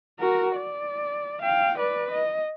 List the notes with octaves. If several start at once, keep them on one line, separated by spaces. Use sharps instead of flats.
F#4 A#4
D5
F5 G5
B4 D5
D#5